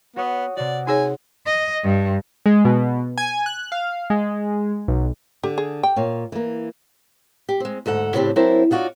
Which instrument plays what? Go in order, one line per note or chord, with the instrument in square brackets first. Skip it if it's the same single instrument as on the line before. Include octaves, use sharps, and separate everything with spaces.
[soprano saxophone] B3 [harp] F#4 C#5 D#6
[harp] C3 F#4 [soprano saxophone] D5
[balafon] D#4 G#4 C#5 [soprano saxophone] G#5
[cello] D#5
G2
[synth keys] G#3
B2
G#5
F#6
F5
G#3
B1
[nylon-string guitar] D3 [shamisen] G4
[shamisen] G#4
[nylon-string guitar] G4 [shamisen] G5
[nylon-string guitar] A#2 C#5 F5
E3 A#3
[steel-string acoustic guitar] G4
G#3 C4
D2 G#2 A4 F#5
A2 C#3 C4 D4 G4
F#3 C4 D4 E4 A#4 C5
D#4 F4 F#4 C#5 D5